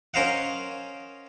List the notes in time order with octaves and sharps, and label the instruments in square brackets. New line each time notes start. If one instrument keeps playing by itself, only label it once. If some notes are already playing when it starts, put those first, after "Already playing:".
[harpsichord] C#4 A#4 C5 D#5 F5 F#5